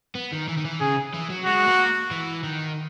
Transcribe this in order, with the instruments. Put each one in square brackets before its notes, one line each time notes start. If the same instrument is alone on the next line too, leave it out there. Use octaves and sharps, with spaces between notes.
[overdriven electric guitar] B3
D#3
E3
D#3
E3
[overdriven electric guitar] C#3 [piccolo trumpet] G#4
[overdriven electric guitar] E3
F#3
[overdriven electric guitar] G#3 [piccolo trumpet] F#4
[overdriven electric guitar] A#3
E3
D#3